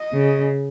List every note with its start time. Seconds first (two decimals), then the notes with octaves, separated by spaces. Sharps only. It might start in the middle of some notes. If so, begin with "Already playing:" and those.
Already playing: D#5
0.14 C#3